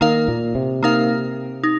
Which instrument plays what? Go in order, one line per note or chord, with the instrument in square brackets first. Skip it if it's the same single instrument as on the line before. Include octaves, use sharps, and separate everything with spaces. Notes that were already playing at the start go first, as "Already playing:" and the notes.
[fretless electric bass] D#3 [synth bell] A#3 D#4 A#4 F5
[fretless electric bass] A#2
C3
[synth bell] A#3 D#4 A#4 F5
D#4